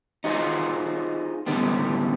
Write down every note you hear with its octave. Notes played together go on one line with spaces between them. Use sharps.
D#4 F4 F#4 G#4 C5
F#2 A2 D3 G3 B3 C4